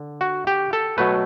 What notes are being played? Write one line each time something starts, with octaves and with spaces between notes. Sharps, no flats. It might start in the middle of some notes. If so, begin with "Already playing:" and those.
Already playing: D3
F#4
G4
A4
B2 F#3 A3 B4